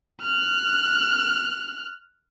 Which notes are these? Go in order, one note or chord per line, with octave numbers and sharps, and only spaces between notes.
F6 F#6